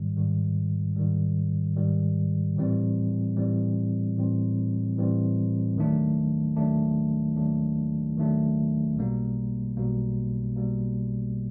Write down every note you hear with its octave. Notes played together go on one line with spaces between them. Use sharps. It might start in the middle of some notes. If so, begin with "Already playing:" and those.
Already playing: G#2 D#3 G3
G#2 D#3 G3
G#2 D#3 G3
G#2 D#3 G3
A2 E3 G3 C4
A2 E3 G3 C4
A2 E3 G3 C4
A2 E3 G3 C4
D#2 D#3 F#3 A3 D4
D#2 D#3 F#3 A3 D4
D#2 D#3 F#3 A3 D4
D#2 D#3 F#3 A3 D4
B1 B2 G3 A#3
B1 B2 G3 A#3
B1 B2 G3 A#3